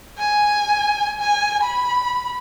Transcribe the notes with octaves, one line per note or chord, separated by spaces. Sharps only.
G#5
G#5
B5